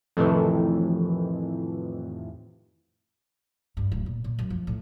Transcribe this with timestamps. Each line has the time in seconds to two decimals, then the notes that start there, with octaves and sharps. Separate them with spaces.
0.17 F2 A2 C3 D#3 E3
3.77 G2
3.92 D1
4.06 A#2
4.24 A#2
4.39 F#2
4.50 F3
4.67 A2